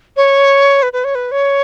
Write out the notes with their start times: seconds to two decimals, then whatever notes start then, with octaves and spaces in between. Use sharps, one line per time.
0.16 C#5
0.82 B4
0.93 B4
1.04 C#5
1.15 B4
1.31 C#5